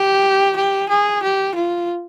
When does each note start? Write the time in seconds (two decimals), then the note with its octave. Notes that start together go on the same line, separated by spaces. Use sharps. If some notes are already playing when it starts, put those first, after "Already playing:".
Already playing: G4
0.57 G4
0.89 G#4
1.23 G4
1.55 F4